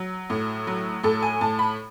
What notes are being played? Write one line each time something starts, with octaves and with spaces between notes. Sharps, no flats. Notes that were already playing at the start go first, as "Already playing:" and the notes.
Already playing: F#3
A2
F#3
A2 A4
G#5
A2 A5
B5